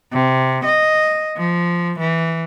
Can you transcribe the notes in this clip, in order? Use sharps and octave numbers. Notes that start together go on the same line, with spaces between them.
C3
D#5
F3
E3